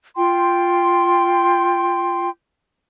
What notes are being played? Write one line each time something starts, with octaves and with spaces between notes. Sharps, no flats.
F4 G5 C6